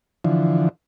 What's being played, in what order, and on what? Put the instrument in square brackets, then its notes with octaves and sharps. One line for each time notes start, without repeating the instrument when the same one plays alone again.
[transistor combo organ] D3 E3 F3